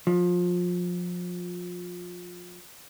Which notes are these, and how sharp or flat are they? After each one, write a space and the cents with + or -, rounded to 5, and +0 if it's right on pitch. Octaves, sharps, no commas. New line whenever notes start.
F3 +25